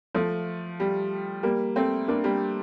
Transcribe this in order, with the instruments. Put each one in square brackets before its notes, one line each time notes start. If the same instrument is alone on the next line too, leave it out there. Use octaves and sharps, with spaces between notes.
[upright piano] F3 A3
G3
G3 A#3
A3 C4
A#3 D4
G3 A#3